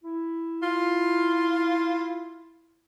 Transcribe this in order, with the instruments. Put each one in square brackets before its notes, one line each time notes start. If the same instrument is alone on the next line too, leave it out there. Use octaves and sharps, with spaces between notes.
[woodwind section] E4
[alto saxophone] F4